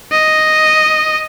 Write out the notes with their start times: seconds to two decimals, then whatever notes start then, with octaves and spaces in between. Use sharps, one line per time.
0.12 D#5